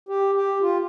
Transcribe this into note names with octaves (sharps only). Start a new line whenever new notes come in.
G4
G4
F4